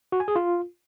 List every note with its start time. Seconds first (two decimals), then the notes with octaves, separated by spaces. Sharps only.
0.12 F#4
0.20 G#5
0.28 G#4
0.36 F4